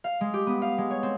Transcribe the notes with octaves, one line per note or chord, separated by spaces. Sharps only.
F5
G#3
G4
B3
F5
G#3
C#5
C4